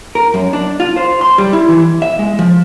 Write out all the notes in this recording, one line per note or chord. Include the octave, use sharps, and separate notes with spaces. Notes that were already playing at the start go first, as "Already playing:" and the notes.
A#4
F#2
D4
F4
C5
C6
G3
E4
E3
E5
G#3
F3